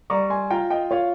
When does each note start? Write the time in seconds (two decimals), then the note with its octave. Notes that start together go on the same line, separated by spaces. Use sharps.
0.10 G3 A#5 C#6
0.30 G#5 C6
0.50 F4 G5 A#5
0.70 D#5 G5
0.91 F4 C#5 F5